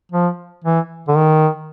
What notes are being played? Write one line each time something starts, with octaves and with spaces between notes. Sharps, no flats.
F3
E3
D3
D#3